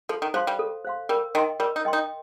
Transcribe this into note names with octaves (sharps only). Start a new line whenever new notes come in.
F3 A4
D#3
F3 C5 F5 C6
G3
A4
C5 F5 C6
G3 A#4
D#3 D#5 G5 C6
G3 A#4
D#4
D#5 G5 C6
D#4